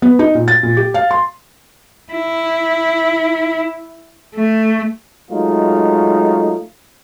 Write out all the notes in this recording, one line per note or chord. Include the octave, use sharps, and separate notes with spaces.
B3
D#4
A#2
A6
A#2
G4
F5
C6
E4
A3
F#3 G#3 A3 D#4 F4